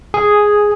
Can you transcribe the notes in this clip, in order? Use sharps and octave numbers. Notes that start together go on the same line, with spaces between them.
G#4